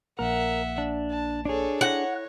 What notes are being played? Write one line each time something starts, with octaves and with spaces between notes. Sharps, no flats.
A#1 A#3 A#4 E5 F#5
D4
A5
D4 G#4 A4 C#5
E4 C#5 F#5 A#6